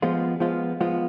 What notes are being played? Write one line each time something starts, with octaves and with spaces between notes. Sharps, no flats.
F3 G#3 B3 F4
F3 G#3 B3 F4
F3 G#3 B3 F4